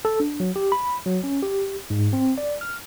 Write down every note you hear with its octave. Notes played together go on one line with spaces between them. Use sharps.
A4
D4
F#3
G4
B5
F#3
C#4
G4
G#2
C4
D5
F6